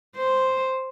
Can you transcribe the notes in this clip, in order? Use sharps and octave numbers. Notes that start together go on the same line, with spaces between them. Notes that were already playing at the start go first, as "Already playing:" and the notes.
C5